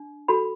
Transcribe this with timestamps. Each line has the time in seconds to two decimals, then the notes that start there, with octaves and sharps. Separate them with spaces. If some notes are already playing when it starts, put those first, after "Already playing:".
Already playing: D4
0.28 F#4 A4 B5